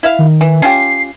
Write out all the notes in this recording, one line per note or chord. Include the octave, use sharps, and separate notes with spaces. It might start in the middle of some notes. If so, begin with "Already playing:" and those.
E4 E5 F5
D#3
E3
C#4 F4 G4 C7